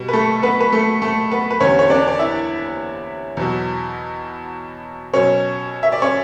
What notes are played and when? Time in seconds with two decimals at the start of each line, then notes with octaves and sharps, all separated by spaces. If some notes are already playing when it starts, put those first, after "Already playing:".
Already playing: B2 G3
0.08 B4
0.13 A3 A4
0.43 B3 B4
0.60 B4
0.72 A3 A4
1.02 A3 A4
1.31 B3 B4
1.50 B4
1.60 E2 D3 G3 C#4 C#5
1.79 C#5
1.90 D4 D5
2.08 D5
2.19 E4 E5
3.37 E2 B2 F#3
5.14 B2 F#3 C#4 C#5
5.83 E5
5.92 D5
6.02 C#4 C#5